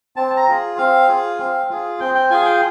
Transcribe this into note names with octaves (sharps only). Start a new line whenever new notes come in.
C4 A5
A#5
F4 G#4
C4 F5
F4 G#4
C4
F4 G#4
C4 G5
G5
F4 G#4 G#5
G5